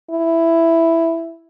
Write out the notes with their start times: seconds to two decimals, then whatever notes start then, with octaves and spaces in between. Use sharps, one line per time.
0.11 E4